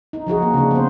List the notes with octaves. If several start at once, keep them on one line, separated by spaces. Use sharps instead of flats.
D#4
F3 D#4 F#4 G#4
A#3
C#3 D4
B3 C5